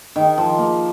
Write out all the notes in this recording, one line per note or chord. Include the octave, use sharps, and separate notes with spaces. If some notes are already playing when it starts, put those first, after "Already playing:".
D#3
F3
A#3